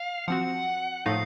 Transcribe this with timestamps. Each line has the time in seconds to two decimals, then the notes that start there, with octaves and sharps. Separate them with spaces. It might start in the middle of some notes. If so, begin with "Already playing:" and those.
Already playing: F5
0.28 F3 C4 F#4 F#5
1.06 A2 F3 A3 D#4 F5